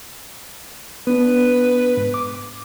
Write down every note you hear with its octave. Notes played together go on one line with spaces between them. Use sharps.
B3 D4 B4
G#2
D6